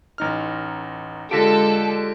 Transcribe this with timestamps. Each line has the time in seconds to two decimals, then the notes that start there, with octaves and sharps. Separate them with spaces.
0.18 A1 D#4 F6
1.31 D3 G#3 F4 G4 A4 A#6 B6 D7